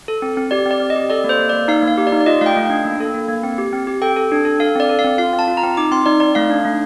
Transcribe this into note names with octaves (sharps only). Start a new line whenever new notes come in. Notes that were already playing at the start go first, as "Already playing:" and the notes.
A4
C4
C4
G4 D5
C4
D5
C4
D#5
G4
A4 D5
A#3
C5
A#3
A#3 D5
D#4 F5
A#3
F5
G4
D5
D#4
D5
F4 D#5
A3 F5 G5
A3
D4 G5
A#3
A4
A#3
A#3
C4
G4
C4
G4
A4 G5
A4
D4
A4
A4 F5
C4 D5
A4
F5
C4
F4 F5
C4
A5
F4
A#5
C4
D#4 D6
C4 C6
D#4 D5
D#4 D5
A3 F5
D4
A3